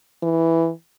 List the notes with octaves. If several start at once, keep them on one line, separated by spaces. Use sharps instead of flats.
E3